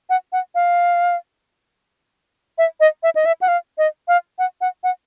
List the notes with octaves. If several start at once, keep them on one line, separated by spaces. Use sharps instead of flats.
F#5
F#5
F5
E5
D#5
E5
D#5
E5
F#5
F5
D#5
F5
F#5
F#5
F#5